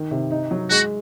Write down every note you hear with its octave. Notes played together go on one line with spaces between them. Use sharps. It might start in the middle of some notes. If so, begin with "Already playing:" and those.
Already playing: D#3
C3
D#4
F#3
G#3 F#4